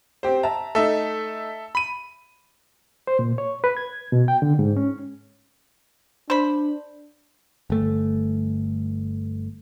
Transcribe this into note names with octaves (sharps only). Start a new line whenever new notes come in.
C4 G4 C5
E5 A5 A#5
A3 D#4 A4 E5
B5 D#7
C5
A#2
C#5
B4
G#6
B2
G5
D3
G#2
C#4
D4 C5 B5
G1 A3